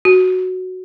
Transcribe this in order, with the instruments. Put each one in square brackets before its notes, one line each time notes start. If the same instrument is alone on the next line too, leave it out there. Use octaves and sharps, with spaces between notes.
[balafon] F#4